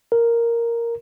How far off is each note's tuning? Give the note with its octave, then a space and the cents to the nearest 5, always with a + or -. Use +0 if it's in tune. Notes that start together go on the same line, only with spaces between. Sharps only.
A#4 +0